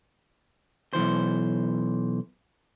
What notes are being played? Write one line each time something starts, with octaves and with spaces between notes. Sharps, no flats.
B1 F#2 E3 C5